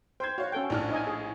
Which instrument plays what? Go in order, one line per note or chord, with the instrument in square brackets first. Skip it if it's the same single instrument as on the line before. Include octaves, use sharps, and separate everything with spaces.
[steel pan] C5 [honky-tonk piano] G5 G#6
[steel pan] F#4 [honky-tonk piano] C#5 F5
[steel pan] C#4 A4 G5
[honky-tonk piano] A#1 A2 F6 [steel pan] D4
[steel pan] D#4 D#5 G#5
G#4